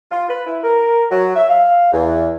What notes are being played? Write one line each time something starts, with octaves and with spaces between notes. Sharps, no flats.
F4
B4
E4
A#4
F#3
E5
F5
E2